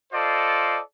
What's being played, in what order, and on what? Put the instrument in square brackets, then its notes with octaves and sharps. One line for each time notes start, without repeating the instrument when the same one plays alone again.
[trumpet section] F4 A4 C5 D5 D#5